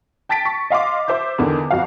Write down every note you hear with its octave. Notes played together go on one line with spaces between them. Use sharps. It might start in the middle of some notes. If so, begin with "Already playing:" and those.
G5 A5 A6 B6 D7
C#6
D#5 F5 C6 D6
C5 E5 D6 G6
E2 D3 D#3
F2 F#4 F5